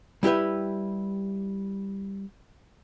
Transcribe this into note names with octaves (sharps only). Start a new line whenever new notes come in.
G3 E4 G4 B4 E5